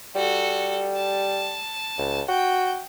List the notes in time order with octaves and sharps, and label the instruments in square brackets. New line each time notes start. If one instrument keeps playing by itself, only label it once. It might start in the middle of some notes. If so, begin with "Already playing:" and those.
[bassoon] G3 [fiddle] F#4 A4
[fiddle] A5
[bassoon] C#2
[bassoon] F#4 [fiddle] G5